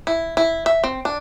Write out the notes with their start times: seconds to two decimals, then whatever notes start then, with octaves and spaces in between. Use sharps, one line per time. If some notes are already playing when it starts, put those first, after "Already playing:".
0.07 E4
0.37 E4
0.66 E5
0.84 C4
1.05 D4